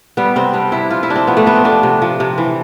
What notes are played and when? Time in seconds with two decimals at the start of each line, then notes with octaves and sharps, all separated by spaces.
0.17 G3 B3
0.36 C3 C4
0.53 G3 D4
0.72 C3 E4
0.91 F3 F4
1.03 E4
1.10 C3 D4
1.15 C4
1.27 F3 B3
1.37 A3
1.46 C3 B3
1.55 C4
1.65 F3 D4
1.83 C3
2.02 F3
2.20 C3
2.38 E3